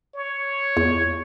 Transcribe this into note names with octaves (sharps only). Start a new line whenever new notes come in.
C#5
E2